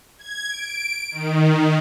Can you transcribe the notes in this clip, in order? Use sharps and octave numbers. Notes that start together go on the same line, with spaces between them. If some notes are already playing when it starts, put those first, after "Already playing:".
G#6
D7
D#3